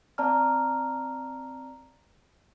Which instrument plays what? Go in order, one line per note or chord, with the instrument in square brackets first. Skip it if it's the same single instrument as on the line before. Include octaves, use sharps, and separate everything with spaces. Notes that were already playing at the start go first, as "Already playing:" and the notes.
[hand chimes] C4 D5 A5 A#5 F6